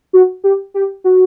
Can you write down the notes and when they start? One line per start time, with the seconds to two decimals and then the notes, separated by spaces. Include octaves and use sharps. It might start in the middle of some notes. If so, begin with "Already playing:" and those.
0.13 F#4
0.44 G4
0.74 G4
1.04 F#4